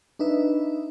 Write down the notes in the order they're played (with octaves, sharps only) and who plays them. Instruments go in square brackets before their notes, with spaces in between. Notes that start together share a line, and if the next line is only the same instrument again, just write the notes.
[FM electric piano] D4 D#4 B4 E5